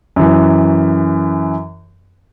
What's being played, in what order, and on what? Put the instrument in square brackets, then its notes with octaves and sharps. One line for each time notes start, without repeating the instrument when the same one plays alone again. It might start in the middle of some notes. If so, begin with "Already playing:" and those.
[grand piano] F#2 E3